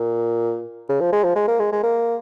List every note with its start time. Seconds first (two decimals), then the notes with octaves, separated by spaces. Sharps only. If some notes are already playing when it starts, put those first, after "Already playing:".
Already playing: A#2
0.89 C#3
1.00 F3
1.12 G#3
1.24 F3
1.35 G#3
1.47 A#3
1.59 G#3
1.72 G#3
1.83 A#3